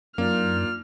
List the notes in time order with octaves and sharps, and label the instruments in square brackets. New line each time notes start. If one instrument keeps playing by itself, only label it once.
[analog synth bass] F#2 [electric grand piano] A#3 [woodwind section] D4 D#4 F4 [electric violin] F6